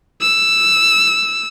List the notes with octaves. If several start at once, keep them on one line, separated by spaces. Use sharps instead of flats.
E6